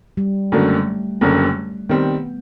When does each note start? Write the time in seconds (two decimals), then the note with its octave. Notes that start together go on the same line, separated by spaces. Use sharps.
0.17 G3
0.52 F#1 F#2 D3 F#3 A3 A#3
1.21 F#1 F#2 D3 F#3 A#3
1.89 D#3 G3 B3 C4